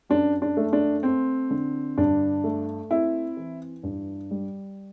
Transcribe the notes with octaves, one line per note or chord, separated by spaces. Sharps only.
F#2 D4
D4
A3
D4
C4
D3
G2 D4
A3
C4 E4
E3
G2
G3